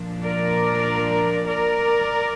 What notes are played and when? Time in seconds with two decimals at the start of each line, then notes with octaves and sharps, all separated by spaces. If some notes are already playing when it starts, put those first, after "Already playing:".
Already playing: A#2 F3 D4
0.24 A#4 D5
1.48 A#4 D5